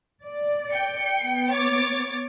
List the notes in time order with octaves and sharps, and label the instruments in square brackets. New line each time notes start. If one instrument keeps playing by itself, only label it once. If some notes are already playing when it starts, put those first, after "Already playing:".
[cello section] D5
[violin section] G5 C#7
[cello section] B3
[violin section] C#5 D6 A6